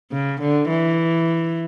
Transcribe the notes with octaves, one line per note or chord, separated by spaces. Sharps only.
C#3
D3
E3